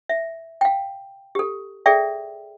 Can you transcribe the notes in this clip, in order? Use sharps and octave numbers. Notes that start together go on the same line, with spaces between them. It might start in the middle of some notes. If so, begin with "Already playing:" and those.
E5
F5 G5
G4 A4
G#4 A4 D5 E5 G5